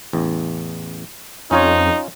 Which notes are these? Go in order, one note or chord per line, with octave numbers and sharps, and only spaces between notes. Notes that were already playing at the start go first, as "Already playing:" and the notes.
A1 E2
F2 C#4 D#4 F4 C#5